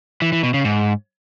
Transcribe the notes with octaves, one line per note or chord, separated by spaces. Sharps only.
E3
E3
B2
C#3
G#2